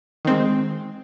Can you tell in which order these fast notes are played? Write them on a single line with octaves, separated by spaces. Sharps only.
D#3 C4 G#3